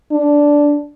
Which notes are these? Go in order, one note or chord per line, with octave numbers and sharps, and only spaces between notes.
D4